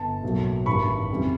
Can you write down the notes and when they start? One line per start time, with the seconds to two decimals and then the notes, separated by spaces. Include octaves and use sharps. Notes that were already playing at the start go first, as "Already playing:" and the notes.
Already playing: G1 A5
0.23 B1 A2 F#3 A#3
0.66 A1 G2 D#3 G3 B5 C#6
1.11 F2 C#3 E3 G3